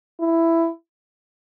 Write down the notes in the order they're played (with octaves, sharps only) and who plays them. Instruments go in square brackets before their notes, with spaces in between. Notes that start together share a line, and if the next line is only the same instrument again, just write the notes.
[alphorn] E4